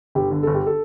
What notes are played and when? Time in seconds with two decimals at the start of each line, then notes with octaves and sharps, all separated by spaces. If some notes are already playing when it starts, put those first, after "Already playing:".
0.15 G1 G4
0.31 D3
0.43 G1 A4
0.54 G4
0.66 A4